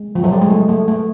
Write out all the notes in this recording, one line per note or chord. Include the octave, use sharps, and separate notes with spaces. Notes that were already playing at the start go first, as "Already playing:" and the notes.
Already playing: G#3
F3
F#3
G3
G#3
A3
A3
A3